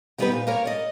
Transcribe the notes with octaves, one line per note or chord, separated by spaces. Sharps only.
D#3 G3 B3 D#4 G4 B4
A#2
A#3 A#4 C#5
D5 D#5